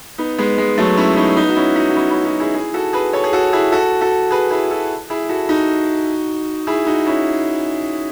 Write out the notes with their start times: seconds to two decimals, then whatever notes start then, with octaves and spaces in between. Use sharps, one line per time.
0.18 B3 D#4
0.38 G#3 B3
0.58 G#3
0.78 F#3 A3
0.97 C#4 E4
1.16 B3 D#4
1.36 B3 D#4
1.49 F#4
1.56 C#4 E4
1.76 D#4 F#4
1.89 F#4
1.95 C#4 E4
2.10 C#4 E4
2.25 D#4 F#4
2.40 E4 G#4
2.54 E4 G#4
2.74 F#4 A4
2.93 G#4 B4
3.13 A4 C#5
3.24 G#4
3.33 F#4 A4
3.53 E4 G#4
3.72 F#4 A4
4.01 F#4 A4
4.31 G#4 B4
4.51 E4 G#4
4.71 F#4 A4
5.10 E4 G#4
5.29 F#4 A4
5.49 D#4 F#4
6.67 E4 G#4
6.87 D#4 F#4
7.06 C#4 E4